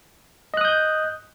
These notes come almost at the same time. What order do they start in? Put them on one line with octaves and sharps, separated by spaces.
D#5 F#6 D#6 G6